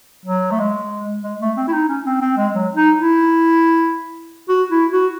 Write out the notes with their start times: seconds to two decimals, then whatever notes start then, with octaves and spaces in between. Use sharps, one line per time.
0.25 F#3
0.51 A3
0.59 G#3
1.23 G#3
1.40 A3
1.57 C4
1.68 E4
1.73 D#4
1.88 C#4
2.05 C4
2.21 C4
2.37 G#3
2.54 F#3
2.75 D#4
2.97 E4
4.48 F#4
4.71 E4
4.92 F#4